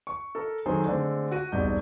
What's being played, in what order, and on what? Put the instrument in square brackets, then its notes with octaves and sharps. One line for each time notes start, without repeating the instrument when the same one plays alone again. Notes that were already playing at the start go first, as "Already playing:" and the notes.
[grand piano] C#6
A4 A#4
D#3 F#3 C4 G#4 A4 C5
D3 G#3 A3 C4
F#4 D#7
E1 C2 G#2 G6